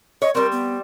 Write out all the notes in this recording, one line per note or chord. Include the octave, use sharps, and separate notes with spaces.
C#5 D#5
G3 C4 A#4
B3